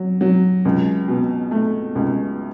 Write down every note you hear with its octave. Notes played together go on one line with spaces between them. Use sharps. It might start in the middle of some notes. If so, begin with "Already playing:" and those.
Already playing: F#3
F#3
C#2
B2
A3
C#2